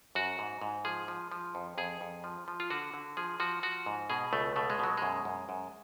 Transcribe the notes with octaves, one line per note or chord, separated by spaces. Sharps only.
F#2 F#4
G#2
G#2
F3 G#4
F3
F3
F2
F2 G#4
F2
F3
F3
F4
D3 F#4
D3
F3 G#4
F3 F#4
F3 F#4
G#2
B2 G#4
C#2 A3
B2 A3
G#3
B2 F#3
F#2 G#3
F#2
F#2